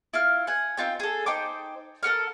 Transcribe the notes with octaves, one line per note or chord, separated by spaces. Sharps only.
E4 F4 F6
F#5 G#5
C4 D#4 F4 G5
G#4 A4
D#4 C5 G5 D6
A4 A#4 F#5 F6